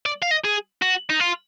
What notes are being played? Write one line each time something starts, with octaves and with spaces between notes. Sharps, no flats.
D5
F5
D#5
G#4
F#4
D#4
F4